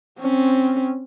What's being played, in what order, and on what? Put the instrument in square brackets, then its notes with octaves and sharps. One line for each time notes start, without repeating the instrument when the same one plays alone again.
[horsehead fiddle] C4 C#4